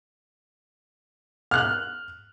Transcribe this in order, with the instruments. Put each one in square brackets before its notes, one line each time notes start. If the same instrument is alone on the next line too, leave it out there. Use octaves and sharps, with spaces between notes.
[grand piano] F6 F#6